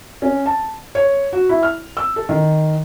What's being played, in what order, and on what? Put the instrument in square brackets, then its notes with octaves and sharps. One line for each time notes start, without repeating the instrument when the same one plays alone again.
[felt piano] C#4
A5
C#5
F#4
E4
F6
E6
A4
D#3